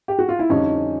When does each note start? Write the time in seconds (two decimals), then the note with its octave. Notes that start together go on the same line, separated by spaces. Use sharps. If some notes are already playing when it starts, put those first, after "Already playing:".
0.08 G4
0.19 F#4
0.29 F4
0.39 E4
0.50 F2 D3 G3 C#4 D#4